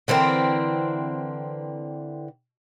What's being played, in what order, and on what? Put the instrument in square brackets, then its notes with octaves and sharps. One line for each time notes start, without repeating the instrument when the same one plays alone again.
[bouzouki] D3 E3 C4 A#4